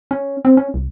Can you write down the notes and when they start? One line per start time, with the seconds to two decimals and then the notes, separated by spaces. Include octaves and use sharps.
0.11 C#4
0.45 C4
0.57 C#4
0.74 C2